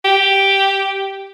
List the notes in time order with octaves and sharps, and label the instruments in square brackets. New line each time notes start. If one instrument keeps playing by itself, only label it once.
[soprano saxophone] G4